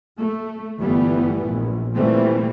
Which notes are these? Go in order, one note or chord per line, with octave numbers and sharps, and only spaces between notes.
A3
G1 E3 G3 A3 B3
A#1
A#2 E3 G3 A3 C4